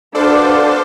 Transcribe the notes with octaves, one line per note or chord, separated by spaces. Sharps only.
D4 F#4 A4 B4 C5 D5 F5